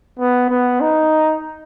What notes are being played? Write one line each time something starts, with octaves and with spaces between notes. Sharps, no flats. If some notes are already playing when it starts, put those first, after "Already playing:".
B3
B3
D#4